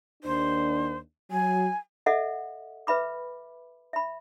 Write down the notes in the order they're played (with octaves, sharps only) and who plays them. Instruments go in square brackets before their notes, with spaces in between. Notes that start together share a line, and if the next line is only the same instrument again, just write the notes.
[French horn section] D#2 D4 [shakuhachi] C5
[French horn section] F#3 [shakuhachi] G#5
[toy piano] A4 D#5 E5 F#5
B4 E5 B5 D6
E5 B5